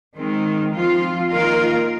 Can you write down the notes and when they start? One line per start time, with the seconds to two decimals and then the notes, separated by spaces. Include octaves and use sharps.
0.16 D#3 G#3 C4
0.73 F3 C4 F4
1.29 D#3 A#3 F4 A#4